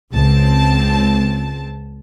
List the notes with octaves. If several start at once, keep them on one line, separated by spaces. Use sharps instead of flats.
C#2 C4 A5